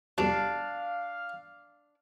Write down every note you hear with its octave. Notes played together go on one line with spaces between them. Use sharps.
C2 F2 B2 D4 F5